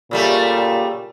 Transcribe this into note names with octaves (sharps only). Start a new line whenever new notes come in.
A#2 C#3 G3 A3